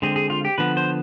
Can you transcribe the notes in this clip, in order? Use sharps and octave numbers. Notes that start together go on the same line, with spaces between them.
D3 G#3 C4 G#4
G#4
F4
G4
D3 F3 B3 B4
C5